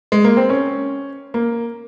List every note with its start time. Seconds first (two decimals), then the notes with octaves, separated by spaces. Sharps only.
0.12 G#3
0.24 A#3
0.37 C4
0.49 C#4
1.34 A#3